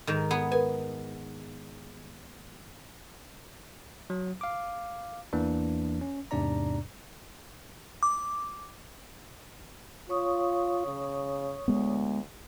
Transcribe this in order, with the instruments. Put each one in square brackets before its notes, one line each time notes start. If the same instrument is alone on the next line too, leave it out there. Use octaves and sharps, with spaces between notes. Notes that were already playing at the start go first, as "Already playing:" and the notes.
[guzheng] G#2 D#3
B3 G#4
[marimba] A#4 B4 [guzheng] G#5
[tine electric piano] F#3
F5 D6
E2 E3 A#3 D4
C#4
E2 G#2 C3 D4 D5 A#5
[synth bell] D6
[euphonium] F4 [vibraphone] C#5 C#6 D#6
[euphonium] C#3
[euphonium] D2 [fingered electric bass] G#3 B3